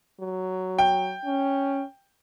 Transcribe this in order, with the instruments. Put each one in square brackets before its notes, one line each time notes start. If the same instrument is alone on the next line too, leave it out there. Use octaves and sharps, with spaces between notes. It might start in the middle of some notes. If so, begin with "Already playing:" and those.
[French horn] F#3
[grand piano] G5
[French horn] C#4